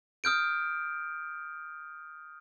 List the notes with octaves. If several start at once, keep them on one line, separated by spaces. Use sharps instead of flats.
D#6 F6 G6 D7